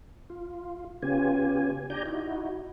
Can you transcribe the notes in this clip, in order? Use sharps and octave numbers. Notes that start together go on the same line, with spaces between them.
F4
C#3 B3 C#4 F4 G4 G#5
D4 G4 D5 G#5 A#5 G6
D#4 E4 F#4